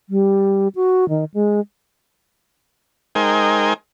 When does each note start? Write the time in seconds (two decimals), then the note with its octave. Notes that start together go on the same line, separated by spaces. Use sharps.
0.09 G3
0.75 F#4
1.09 D#3
1.34 G#3
3.15 G#3 D#4 A#4 C5 G5 G#5